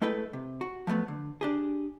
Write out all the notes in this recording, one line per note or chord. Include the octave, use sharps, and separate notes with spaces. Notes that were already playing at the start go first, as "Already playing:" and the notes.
G#3 A3 E4 A4 B4 G5
C3
F#4
F3 F#3 A3 B3
D3
D4 G4 G#4